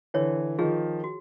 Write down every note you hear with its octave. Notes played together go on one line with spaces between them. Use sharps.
D3 E3 C#5
D#3 F3 G#4
F#4